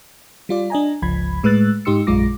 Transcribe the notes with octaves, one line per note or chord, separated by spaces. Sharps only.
G3 F4 D5
D4 D#5 G#5 A#5
G1 C#2 F3 B5 G#6
A2 G#3 B4 E6 F#6 A6
G#2 D#4 G4 C6 E6 C#7
A#1 F#2 G#3 F4 D6 A#6